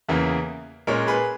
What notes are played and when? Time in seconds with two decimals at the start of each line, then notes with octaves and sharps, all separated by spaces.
0.08 E2 C#3 E3 A#3
0.87 A#2 G#3 C#4 A#4 C#5
1.07 G#4 B4